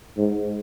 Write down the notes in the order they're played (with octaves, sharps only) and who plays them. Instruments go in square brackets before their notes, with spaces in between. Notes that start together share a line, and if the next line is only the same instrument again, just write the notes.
[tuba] G#2